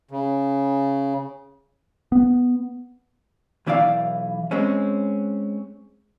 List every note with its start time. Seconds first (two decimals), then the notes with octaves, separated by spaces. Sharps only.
0.11 C#3
2.12 B3
3.67 B1 E3 E4 D5 F5
4.51 G#3 C4 C#4